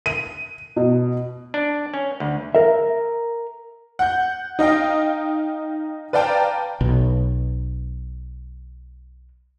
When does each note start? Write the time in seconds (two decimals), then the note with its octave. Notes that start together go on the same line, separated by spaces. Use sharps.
0.06 D#7
0.76 B2
1.54 D4
1.94 C#4
2.20 D2
2.55 A#4 E5
3.99 F#5 G6
4.59 D#4 D#5 F5 G5
6.13 B4 D5 F5 G5 A5 A#5
6.81 B1 B2